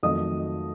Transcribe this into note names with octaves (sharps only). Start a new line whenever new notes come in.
F2 D#3 F#3 A3 D#5 D#6